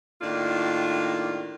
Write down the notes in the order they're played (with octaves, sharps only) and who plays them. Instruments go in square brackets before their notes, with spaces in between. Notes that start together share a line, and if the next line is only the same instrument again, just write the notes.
[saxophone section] A2 D#3 A#3 D4 F4 D5